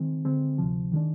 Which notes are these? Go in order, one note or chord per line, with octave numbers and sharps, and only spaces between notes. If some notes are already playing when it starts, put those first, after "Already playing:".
Already playing: D#3 G#3 C4
D3 G#3 C4
D2 C3 F3
D#3 G#3 D4